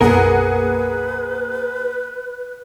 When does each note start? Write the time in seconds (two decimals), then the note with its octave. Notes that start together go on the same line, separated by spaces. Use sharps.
0.01 B1 F#2 A#3 B3 G#4 A#4 B4 F#5